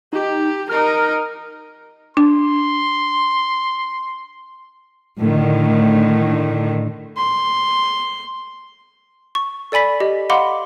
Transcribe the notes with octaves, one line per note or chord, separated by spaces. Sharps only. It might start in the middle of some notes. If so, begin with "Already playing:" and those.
D#4 G4
D#4 A#4 F6
D4 C6
A2 D3 D#3
C6
C#6
A4 D5 G#5 B5 B6
G4 D#5
D#5 F5 F#5 B5 C6 D6